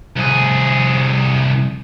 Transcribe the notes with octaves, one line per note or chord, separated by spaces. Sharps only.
C2 G#4